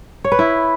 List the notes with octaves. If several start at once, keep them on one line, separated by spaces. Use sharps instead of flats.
C#5
B4
E4